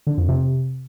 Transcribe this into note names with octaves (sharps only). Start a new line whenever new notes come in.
D3
F2
C3